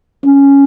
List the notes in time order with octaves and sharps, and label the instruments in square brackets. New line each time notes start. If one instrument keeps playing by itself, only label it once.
[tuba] C#4